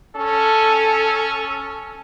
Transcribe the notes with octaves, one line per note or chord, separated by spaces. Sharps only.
C#4 A4